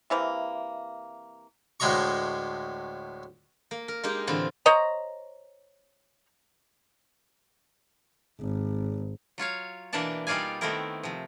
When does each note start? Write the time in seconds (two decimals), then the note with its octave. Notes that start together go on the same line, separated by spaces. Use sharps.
0.10 C3 E3 A#3
1.80 D2 A2 G#3 D#5 A#5 C#6
3.71 A#3
3.88 A#4
4.03 G#3 A#3 D#4 G4 G#4
4.27 A2 D3 E3 C4 E4 F4
4.66 C5 C#5 D#5 A#5
8.40 G#1
9.38 F#3 F4 C#5 F5
9.93 B2 E3 A#3 D4 D5 A5
10.27 G3 D#4 F4 D5 F5 G#5
10.61 D#3 A3 B3 C4 E4 A#4
11.03 C3 F3